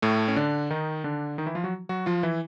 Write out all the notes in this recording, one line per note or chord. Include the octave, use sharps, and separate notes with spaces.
A2 A3
C#4
D3 D4
D#3 D#4
D3 D4
D#3 D#4
E3 E4
F3 F4
F#3 F#4
F#3 F#4
F3 F4
E3 E4